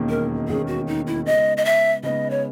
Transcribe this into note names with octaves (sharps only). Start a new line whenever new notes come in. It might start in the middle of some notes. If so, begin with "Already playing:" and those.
Already playing: E1 D#2 D#3 A#3 C#4
A#4
E1 D#2 D#3 A#3 C#4 G#4
F#4
D#4
E4
C#3 G#3 B3 D#4 D#5
D#5
E5
C#3 G#3 B3 D#4 D#5
C#5